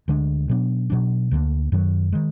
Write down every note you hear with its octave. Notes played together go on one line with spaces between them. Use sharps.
D2 D3 G#3 D4
B2 F#3 B3 D4
B2 F#3 D4
D2 D3 F3 A#3
F#2 D#3 F#3
D#3 G#3